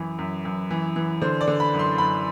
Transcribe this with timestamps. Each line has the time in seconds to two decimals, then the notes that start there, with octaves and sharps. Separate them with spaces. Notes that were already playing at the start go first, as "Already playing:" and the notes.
Already playing: F#2 E3
0.18 F#2
0.45 F#2
0.71 E3
0.96 E3
1.22 D3 C5
1.41 D5
1.48 D3
1.60 B5
1.73 F#2
1.79 C6
1.98 F#2 B5